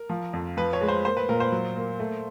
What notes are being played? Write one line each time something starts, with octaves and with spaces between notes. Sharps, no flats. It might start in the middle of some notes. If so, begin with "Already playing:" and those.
Already playing: A#4
F3
F2
F3 B4
C#5
G#3
C5
A#3 C5
B4
A#2 A#4
C5
F#3
A#3
A3